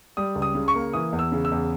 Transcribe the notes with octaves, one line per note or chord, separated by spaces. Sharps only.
G3 D#6
C#2
D#6
C#3
C#6
A#3
E3 D#6
E2
E6
C#3
E6
E2